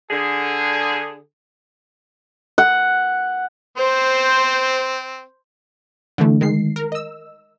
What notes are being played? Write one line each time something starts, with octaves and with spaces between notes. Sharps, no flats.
D3 G#4
F#5
C4 C5
D3 E3 A3
D#3 G#3 C7
A#4
D#5 E6